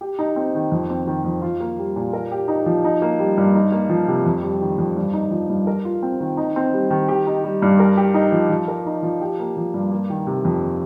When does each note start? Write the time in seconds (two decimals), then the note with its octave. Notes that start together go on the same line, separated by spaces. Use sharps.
0.01 G4
0.19 D#4
0.36 C4
0.54 D#3
0.72 F2
0.90 C4
1.07 D#3
1.24 F2
1.42 F4
1.60 A#3
1.78 G3
1.96 A#2
2.13 A#4
2.31 G4
2.48 D#4
2.66 F3
2.84 D#4
3.02 A#3
3.19 G3
3.37 G2
3.55 D#4
3.72 A#3
3.89 F3
4.08 C3
4.26 F2
4.43 G3
4.61 D#3
4.78 F2
4.97 G2
5.13 D#4
5.31 F3
5.49 G2
5.67 A#4
5.85 F4
6.03 C4
6.20 D#3
6.37 D#4
6.56 C4
6.73 G3
6.90 D#3
7.08 G4
7.27 D#4
7.44 G3
7.62 G2
7.80 A#4
7.97 G4
8.14 D#4
8.32 F3
8.50 F3
8.68 A#4
8.86 D#4
9.03 F3
9.21 G4
9.39 A#3
9.57 F3
9.74 G2
9.92 A#3
10.10 D#3
10.26 C3
10.45 F2